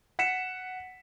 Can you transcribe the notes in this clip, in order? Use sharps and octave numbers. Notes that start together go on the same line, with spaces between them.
F#5 B6 C#7 E7